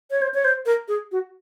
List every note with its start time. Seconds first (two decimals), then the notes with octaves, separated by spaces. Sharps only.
0.11 C#5
0.22 C5
0.34 C#5
0.45 C5
0.66 A#4
0.88 G#4
1.12 F#4